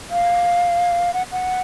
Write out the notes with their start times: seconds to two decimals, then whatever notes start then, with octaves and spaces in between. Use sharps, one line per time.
0.11 F5
1.14 F#5
1.32 F#5